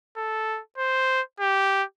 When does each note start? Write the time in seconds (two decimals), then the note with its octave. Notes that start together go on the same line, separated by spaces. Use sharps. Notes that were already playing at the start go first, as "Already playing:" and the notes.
0.17 A4
0.78 C5
1.40 G4